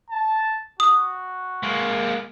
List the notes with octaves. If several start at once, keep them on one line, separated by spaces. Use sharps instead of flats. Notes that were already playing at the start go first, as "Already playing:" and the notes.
A5
F#4 D#6
G#3 A#3